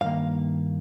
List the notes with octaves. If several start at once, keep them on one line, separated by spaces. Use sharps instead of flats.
G2 D#3 A#3 F5